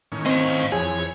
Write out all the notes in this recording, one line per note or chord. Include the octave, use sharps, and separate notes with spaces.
A2 D#3 C#4
C4 D#5 F5
F2 E3 G#4 C#5